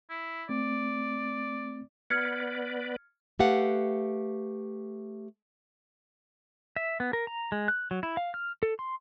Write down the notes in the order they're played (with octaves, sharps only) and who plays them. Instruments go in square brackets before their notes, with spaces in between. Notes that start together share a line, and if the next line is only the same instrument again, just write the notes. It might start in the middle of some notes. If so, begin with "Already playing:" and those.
[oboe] E4
[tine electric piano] A3 C4 [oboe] D5
[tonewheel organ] B3 B4 D5 [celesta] F6 G#6 C#7
[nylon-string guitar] A3 G4 B4 F5 F#5
[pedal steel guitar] E5
B3
A#4
A#5
G#3
F#6
F#3
E4
F5
F6
A4
C6